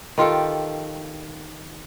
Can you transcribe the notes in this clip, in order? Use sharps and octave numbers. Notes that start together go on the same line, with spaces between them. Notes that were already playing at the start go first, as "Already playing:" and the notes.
D#3 F4 G4 A4